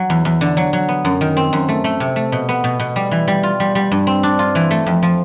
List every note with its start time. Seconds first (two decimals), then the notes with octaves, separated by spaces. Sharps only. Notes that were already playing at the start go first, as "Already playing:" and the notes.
Already playing: F#3
0.10 E2
0.25 E2
0.41 D3
0.57 F#3
0.73 F#3
0.89 B3
1.05 F#2
1.21 D#3
1.37 C4
1.53 F#2
1.69 A3
1.84 A3
2.00 C3
2.16 A3
2.32 B2
2.49 B3
2.64 B2
2.80 B2
2.96 G3
3.11 E3
3.28 G3
3.43 F4
3.60 G3
3.75 G3
3.92 G2
4.07 C4
4.23 D4
4.39 F4
4.55 E3
4.71 A3
4.86 F2
5.03 F3